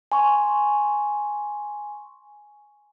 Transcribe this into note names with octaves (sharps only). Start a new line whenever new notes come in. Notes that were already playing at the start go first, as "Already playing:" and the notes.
G#5 C6 C#6